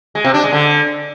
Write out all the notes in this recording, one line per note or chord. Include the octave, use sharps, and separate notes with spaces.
G#3
C3
D4
G#3
D3